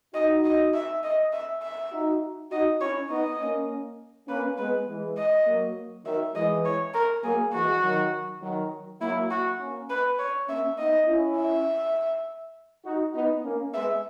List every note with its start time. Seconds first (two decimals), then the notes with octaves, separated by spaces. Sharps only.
0.14 D#4 F#4 D#5
0.44 D#5
0.74 E5
1.03 D#5
1.33 E5
1.62 E5
1.92 D#4 F#4
2.51 D#4 F#4 D#5
2.80 C#4 E4 C#5
3.10 B3 D#4 D#5
3.40 A#3 C#4
4.28 A#3 C#4 B4
4.58 G#3 B3 B4
4.87 E3 G#3
5.17 D#5
5.47 F#3 A#3
6.05 D#3 F#3 E5
6.34 E3 G#3 D#5
6.65 C#5
6.94 A#4
7.23 F#3 A#3 G#4
7.53 E3 G#3 F#4
7.83 D#3 F#3
8.41 D#3 F#3
9.01 F#3 A#3 E4
9.30 F#4
9.60 A#3 C#4
9.90 B4
10.19 C#5
10.48 A#3 C#4 E5
10.78 B3 D#4 D#5
11.07 C#4 E4
11.37 E5
12.85 D#4 F#4
13.14 B3 D#4
13.44 A#3 C#4
13.73 G#3 B3 E5